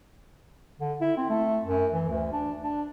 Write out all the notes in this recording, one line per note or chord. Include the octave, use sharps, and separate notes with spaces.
D3
E4
C4
A3
F#2
E3
D2
D4
D4